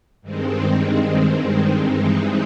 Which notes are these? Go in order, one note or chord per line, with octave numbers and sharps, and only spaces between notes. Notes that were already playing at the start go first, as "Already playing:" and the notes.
G2 D#3 G#3 C4
G2 E3 G#3 C4 D#4